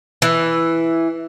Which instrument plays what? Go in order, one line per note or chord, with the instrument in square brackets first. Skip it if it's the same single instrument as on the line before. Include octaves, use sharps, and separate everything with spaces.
[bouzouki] E3